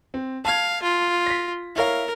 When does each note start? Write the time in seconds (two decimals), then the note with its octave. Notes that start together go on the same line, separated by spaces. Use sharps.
0.14 C4
0.45 F5 A5 G#6
0.83 F4
1.26 A#6 B6
1.76 E4 A#4 C#5 F5